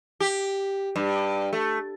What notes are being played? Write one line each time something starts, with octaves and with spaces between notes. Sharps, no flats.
G4
G2
A3